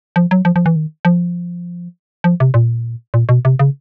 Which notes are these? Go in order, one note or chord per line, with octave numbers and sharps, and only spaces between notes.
F3
F#3
F3
F3
E3
D#3
F3
F3
C3
A#2
A#2
B2
C3
C#3